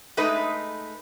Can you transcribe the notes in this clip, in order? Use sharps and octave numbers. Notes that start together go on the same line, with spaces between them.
G#3 A3 D#4 B4